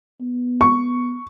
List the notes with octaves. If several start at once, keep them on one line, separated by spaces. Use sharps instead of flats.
B3
C#6